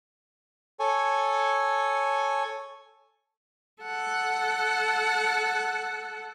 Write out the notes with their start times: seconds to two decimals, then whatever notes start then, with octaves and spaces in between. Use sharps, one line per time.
0.80 A4 C#5 G#5
3.84 A4 F#5